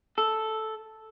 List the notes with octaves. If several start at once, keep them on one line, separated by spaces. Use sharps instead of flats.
A4